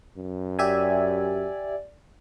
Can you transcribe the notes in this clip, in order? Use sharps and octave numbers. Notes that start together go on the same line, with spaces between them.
F#2
G4 D5 E5 G#5